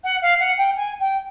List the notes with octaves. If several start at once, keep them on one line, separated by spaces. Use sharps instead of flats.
F#5
F5
F#5
G5
G#5
G5